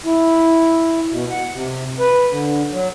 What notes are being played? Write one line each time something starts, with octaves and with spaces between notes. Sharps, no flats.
E4
B2
F#5
C3
B4
D3
F#3